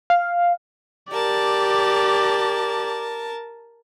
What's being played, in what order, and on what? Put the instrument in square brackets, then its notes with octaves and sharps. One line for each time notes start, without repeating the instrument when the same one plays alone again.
[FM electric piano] F5
[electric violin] G4 D5 [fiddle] A#4 A5